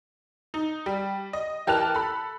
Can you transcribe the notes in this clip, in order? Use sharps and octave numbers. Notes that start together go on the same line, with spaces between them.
D#4
G3
D#5
E3 G4 A#4 A5 F#6 F7
A4 B5